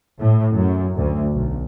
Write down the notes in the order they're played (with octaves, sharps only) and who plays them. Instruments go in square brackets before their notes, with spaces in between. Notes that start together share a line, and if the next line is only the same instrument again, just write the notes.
[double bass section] A2
F#2
D2
B1